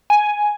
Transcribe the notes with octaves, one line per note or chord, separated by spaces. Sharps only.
G#5